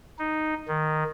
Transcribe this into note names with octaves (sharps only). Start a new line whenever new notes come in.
D#4
D#3